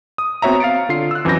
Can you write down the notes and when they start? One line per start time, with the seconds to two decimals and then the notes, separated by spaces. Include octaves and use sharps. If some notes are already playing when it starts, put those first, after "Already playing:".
0.18 D#6
0.42 B3 C4 F#4 C#5 E5 A#5
0.60 F5 A6 C#7 D7
0.89 D3 F4 C7
1.11 E6 F#6
1.25 F2 E3 F#3 C#4 G6 A#6